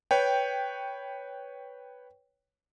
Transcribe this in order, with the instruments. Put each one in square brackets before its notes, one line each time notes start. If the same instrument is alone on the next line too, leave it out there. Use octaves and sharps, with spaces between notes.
[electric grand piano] B4 C#5 G5